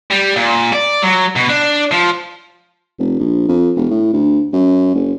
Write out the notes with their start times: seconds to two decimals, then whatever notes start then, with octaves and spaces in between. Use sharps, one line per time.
0.11 G3
0.36 A#2
0.72 D5
1.02 F#3
1.36 B2
1.49 D4
1.92 F3
2.99 F1
3.19 A#1
3.48 F2
3.76 E1
3.91 A2
4.13 D2
4.53 F#2
4.95 F#1